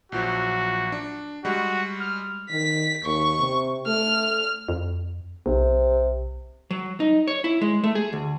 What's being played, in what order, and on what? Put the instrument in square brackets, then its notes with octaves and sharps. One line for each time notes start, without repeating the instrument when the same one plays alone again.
[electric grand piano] A#1 F3 F#3 [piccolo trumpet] F#4
[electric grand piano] D4
[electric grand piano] G3 G#3 [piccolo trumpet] F#4
[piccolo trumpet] F6
[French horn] D#3 [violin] B6
[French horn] D#2 [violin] C#6
[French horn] C3
[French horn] A3 [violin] F6
[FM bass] F2
[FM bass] B1 [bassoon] C3
[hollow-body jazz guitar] F#3
D#4
C#5
E4
G#3
A3
G#4
D2